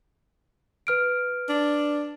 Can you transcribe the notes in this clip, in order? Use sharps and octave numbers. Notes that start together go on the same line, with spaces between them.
B4 F6 D7
D4